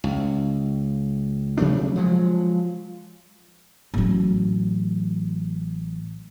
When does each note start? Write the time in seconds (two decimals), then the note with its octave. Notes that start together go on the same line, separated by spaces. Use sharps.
0.04 C#2
1.58 C3 F#3 A3 D4
1.96 F3 F#3 G#3
3.94 A1 F#3